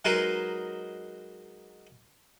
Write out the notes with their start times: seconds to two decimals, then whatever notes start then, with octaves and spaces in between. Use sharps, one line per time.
0.05 F#3 G#3 D#4 A#4 B4 C6